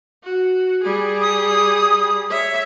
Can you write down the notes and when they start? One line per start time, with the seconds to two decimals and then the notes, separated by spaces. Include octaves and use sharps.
0.24 F#4
0.83 G3 G#4
1.21 D#6
2.30 C#5 E5